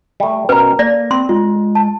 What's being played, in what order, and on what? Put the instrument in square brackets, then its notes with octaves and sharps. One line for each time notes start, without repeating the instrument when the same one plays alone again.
[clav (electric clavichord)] G3 A3
[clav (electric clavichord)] B2 A#4 [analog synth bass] C#4 [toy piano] B4
[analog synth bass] A#3 [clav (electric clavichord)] A4 [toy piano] D5 [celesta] A#6
[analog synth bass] C4 [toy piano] C6
[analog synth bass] G#3 [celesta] F4
[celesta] A5